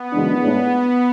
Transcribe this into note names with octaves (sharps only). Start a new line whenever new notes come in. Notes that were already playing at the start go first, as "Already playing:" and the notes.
Already playing: B3
F#2 C#3 E3 G#3 D4
A2 G#3 B3 D4